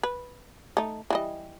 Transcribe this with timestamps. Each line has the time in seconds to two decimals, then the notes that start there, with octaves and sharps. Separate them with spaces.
0.03 B4
0.77 A3 D#4
1.10 E3 G3 D#5